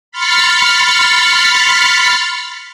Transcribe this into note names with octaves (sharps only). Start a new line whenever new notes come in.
B5 C6 F6 A6 B6 C#7